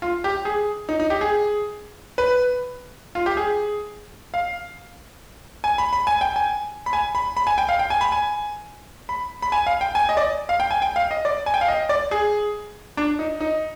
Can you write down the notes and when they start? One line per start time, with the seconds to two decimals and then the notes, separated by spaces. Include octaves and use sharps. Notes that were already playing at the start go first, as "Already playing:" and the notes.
0.02 F4
0.24 G4
0.45 G#4
0.89 D#4
1.00 D#4
1.10 G4
1.21 G#4
2.18 B4
3.15 F4
3.26 G4
3.37 G#4
4.34 F5
5.64 G#5
5.78 B5
5.93 B5
6.07 G#5
6.21 G5
6.36 G#5
6.86 B5
6.93 G#5
7.15 B5
7.37 B5
7.47 G#5
7.58 G5
7.69 F5
7.79 G5
7.90 G#5
8.01 B5
8.12 G#5
9.09 B5
9.42 B5
9.52 G#5
9.67 F5
9.81 G5
9.95 G#5
10.09 D#5
10.17 D5
10.49 F5
10.60 G5
10.71 G#5
10.82 G5
10.96 F5
11.11 D#5
11.25 D5
11.46 G#5
11.54 G5
11.61 F5
11.68 D#5
11.89 D5
12.11 G#4
12.97 D4
13.19 D#4
13.41 D#4